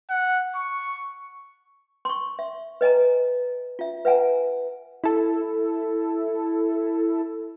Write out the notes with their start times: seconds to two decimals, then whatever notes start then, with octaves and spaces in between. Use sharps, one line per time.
0.10 F#5
0.56 C#6
2.05 C6 C#6
2.39 E5
2.81 B4 D#5 G#5 A#5
3.79 F4 E5
4.05 B4 E5 F#5 G#5 A#5
5.04 E4 A4